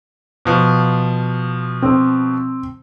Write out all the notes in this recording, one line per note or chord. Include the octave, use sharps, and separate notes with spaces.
B2 F3
C4